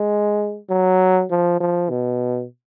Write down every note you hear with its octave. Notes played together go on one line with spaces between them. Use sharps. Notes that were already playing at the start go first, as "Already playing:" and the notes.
Already playing: G#3
F#3
F3
F3
B2